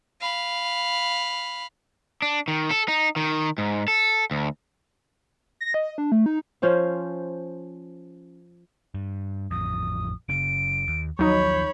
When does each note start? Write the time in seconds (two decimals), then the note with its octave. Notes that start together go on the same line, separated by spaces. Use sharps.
0.21 F5 B5
2.22 D4
2.48 D#3
2.71 A4
2.88 D#4
3.16 D#3
3.58 G#2
3.88 A4
4.31 D2
5.61 A#6
5.74 D#5
5.98 D4
6.12 A3
6.26 D#4
6.62 F3 C#4 C5 F5
8.94 G2
9.51 A1 F2 D#6
10.29 F#1 C#3 D7
10.87 D#2
11.19 D#2 F3 F#3 D#4 C#5 B5 G6